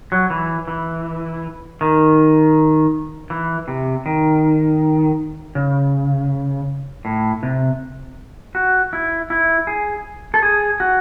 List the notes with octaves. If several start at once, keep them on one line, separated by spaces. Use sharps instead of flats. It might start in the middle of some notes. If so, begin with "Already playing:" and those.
F#3
E3
E3
D#3
E3
C3
D#3
C#3
A2
C3
F#4
E4
E4
G#4
A4
G#4
F#4